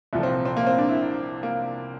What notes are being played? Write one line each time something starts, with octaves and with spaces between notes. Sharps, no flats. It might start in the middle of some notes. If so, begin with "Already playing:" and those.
C2 A#2 F3 A3
C4
C4
A#3
C4
D4
E4
A#3